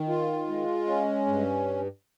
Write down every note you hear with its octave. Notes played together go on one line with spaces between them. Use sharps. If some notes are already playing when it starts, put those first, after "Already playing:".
Already playing: D#3
F4
G#3
C#4
G2